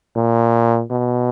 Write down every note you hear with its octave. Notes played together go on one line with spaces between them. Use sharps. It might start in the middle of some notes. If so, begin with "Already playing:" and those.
A#2
B2